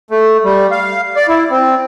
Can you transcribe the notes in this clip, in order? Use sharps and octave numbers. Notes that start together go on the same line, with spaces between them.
A3
G3
F5
D5
E4
C4